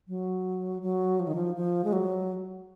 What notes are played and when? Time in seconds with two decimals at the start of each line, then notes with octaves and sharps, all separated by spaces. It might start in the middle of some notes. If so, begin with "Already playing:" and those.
0.08 F#3
0.82 F#3
1.19 F3
1.27 D#3
1.35 F3
1.56 F3
1.84 G#3
1.93 F#3